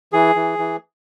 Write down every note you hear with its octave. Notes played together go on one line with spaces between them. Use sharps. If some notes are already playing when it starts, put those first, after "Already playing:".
E3 G#4
E3
E3